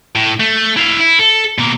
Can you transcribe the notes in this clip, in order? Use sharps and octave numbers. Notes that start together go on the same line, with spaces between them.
A2
A3
E4 F5
E4
A4
B2 A#3